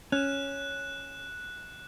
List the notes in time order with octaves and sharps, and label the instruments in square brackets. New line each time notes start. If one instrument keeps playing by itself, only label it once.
[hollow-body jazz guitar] C#4 [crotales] F#6 E7